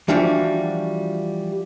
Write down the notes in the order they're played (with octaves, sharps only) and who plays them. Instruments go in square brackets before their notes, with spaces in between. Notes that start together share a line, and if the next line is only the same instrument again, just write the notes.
[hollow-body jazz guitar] E3 F3 G3 D4 F#4